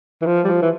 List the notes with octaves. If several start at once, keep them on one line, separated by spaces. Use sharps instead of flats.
E3
F3
G3
F3
E3